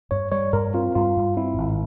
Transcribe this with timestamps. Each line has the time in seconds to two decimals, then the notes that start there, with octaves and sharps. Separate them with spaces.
0.11 G2 C#5
0.32 G3 C#5
0.53 G2 A#4
0.74 C4 F4
0.95 G2 F4
1.17 G2
1.37 C4 E4
1.58 G#1